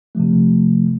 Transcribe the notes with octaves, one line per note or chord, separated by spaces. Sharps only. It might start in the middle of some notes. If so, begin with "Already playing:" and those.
C3 F3 A3